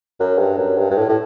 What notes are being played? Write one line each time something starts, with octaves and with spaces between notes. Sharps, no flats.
F#2
G2
F#2
G2
G2
A2
A2